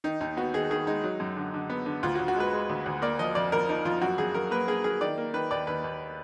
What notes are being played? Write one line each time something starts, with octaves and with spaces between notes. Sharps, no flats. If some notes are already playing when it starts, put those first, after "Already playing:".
D#3 D#4
D#2 D#4
B3 F#4
D#3 G#4
D#3 G#4
G#3 D#4
F#3
F#2
D3
D3
B3
D3
D2 F4
F#4
D2
F#4
G#3 B4
G#3
D2
D2
A#3 D5
F3 D#5
F2 D5
F2 A#4
F3 D#4
F2 F4
F#2 F#4
F#2 G#4
F#2 A#4
A#3 B4
A#3 G#4
A#3 G#4
D#3 D5
A#3
D#3 B4
D#2 D5
D#2 B4
D#2